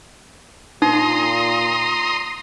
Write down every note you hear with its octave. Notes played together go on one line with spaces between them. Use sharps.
A#2 D#4 A#5 C6 D#6